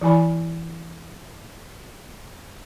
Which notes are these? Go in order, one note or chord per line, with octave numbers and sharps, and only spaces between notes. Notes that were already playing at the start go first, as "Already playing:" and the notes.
E3 E4 G#5 B5